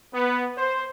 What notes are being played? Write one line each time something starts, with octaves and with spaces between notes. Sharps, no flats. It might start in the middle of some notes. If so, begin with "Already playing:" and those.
B3
C5